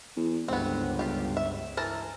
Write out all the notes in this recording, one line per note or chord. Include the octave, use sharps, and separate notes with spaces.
E2
G1 C#2 G2 B3 C4
F4 G4
E5
E3 A#4 A5